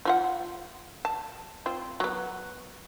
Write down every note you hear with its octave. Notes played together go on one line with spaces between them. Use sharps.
F3 F4 F#5
A5
C4 F4
F#3 B3